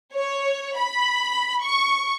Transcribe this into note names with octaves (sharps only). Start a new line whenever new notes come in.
C#5
B5
C#6